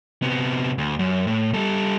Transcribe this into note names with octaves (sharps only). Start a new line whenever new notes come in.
C3 B3
D2
F#2
A2
G3 A4